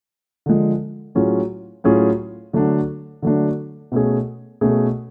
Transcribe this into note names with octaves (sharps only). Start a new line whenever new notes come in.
D3 F3 G#3
A2 F#3 C#4 F4 G#4
A2 F#3 C#4 F4 G#4
D3 F#3 A3 D4
D3 F#3 A3 D4
B2 A3 C#4 G#4
B2 A3 C#4 G#4